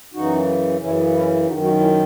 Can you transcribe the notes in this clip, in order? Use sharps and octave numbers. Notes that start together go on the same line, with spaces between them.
F#2 C#3 E3 D#4 F#4
F#2 C#3 E3 C#4 E4
C#4 E4
F#2 D#3 D#4 F#4
D#4 F#4
C#4 E4